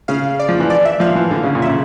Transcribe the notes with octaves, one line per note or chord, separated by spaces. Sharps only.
C#3 F5
D5
F3
E3
D5
E5
F3 F5
E3
D3
C#3
A#2
C#3 E5